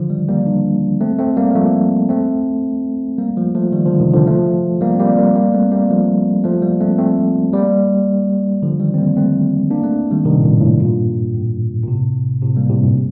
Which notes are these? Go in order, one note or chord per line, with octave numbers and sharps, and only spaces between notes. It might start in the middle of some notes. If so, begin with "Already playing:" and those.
Already playing: D3 F3
D#3 G3
G3 A#3
A#3 D4
A3 C4
A3 C4
G3 A#3
A#3
F3 A3
A3 C4
G3 A#3
F3 A3
F3 A3
D#3 G3
D3 F3
C3 D#3
D3 F3
F3 A3
G3 A#3
C4
G3 A#3
G3 A#3
G3 A#3
A3 C4
G3 A#3
F3 A3
F3 A3
G3 A#3
A3 C4
A3 C4
G3 A#3
D3 F3
D#3 G3
C4
G3 A#3
A3 C4
A#3 D4
A3 C4
D#3 G3
C3 D#3
A#2
A2
G2
A2
G2 A#2
A2
A#2
A2 C3
A2 C3
G3 A#3
A2 C3
G2 A#2